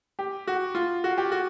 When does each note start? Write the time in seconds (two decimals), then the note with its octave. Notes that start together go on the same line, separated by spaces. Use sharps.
0.19 G4
0.47 F#4
0.75 F4
1.04 F#4
1.18 G4
1.32 F#4